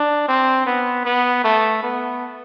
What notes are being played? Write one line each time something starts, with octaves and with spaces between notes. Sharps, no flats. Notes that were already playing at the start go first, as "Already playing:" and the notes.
Already playing: D4
C4
B3
B3
A3
B3